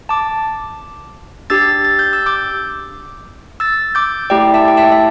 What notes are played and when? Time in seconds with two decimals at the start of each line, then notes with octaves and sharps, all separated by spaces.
0.09 A5 D6
1.50 D4 G4 E6 A6
1.85 A6
1.99 G6
2.13 E6
2.26 D6 G6
3.60 E6 A6
3.95 D6 G6
4.30 A3 E4 G4 D5 G5
4.54 E5 A5
4.68 G5
4.77 E5 A5
4.92 E5